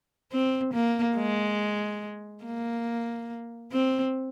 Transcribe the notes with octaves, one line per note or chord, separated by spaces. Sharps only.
C4
A#3
G#3
A#3
C4